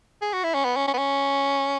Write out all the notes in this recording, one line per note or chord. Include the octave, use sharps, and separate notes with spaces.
G#4
F#4
E4
C#4
B3
C#4
C#4
B3
C#4